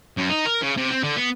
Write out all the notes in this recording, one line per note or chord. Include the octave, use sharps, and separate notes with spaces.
F#2
D#4
A#4
C#3
C3
C4
D3
B3